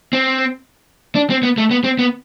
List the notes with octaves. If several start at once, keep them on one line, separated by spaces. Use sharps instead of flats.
C4
D4
C4
B3
A3
B3
C4
B3